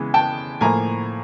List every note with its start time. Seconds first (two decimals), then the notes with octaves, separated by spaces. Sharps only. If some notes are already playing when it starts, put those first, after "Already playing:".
Already playing: C#3 E3 G#3 B3
0.14 G5 A5
0.61 A2 F3 A#3 G#5 A#5